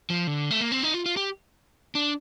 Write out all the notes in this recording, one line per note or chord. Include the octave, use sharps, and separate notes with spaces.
F3
D3
A3
A#3
C4
D#4
F4
F4
G4
D4